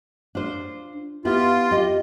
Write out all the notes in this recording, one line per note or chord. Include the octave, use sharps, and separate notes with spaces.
D4 F4 C5
B3 E4 F4 G4
G4 D#5